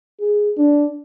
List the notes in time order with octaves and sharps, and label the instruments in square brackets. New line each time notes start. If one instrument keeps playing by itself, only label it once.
[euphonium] G#4
D4